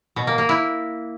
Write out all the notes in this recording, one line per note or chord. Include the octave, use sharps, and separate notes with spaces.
B2
A#3
A#3
E4